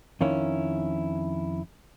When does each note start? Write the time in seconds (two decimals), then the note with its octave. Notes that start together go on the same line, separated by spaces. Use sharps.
0.21 F2 D#3 C#4 E4